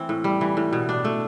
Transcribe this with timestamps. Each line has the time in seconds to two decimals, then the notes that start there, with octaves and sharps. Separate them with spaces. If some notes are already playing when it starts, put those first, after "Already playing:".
Already playing: E3 A3 C4
0.09 A2
0.24 G3
0.41 E3
0.57 A2
0.73 B2
0.89 D4
1.05 A3